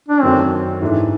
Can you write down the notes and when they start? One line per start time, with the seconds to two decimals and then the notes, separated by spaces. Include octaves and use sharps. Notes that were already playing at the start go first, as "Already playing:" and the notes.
0.08 D4
0.22 F#2 D#3 F#3 A3 C4 C#4
0.82 G#2 E3 A3 D4